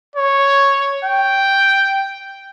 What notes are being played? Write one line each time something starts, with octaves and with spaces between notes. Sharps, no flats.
C#5
G5